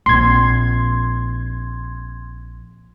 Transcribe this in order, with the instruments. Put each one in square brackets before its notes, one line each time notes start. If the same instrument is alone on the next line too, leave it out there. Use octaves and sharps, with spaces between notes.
[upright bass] A#1 C4 [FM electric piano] C6 G#6